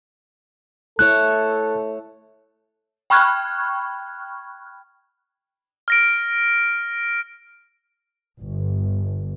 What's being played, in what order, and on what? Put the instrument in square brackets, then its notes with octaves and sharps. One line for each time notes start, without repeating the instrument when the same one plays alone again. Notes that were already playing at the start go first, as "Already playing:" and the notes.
[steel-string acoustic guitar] A3 E4 C#5 [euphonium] A4 [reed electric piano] F#6
[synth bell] G5 B5 C#6 F6 F#6 G#6
[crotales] F6 A#6 D7
[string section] G1